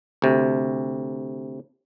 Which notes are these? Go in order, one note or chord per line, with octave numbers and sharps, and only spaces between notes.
D2 C3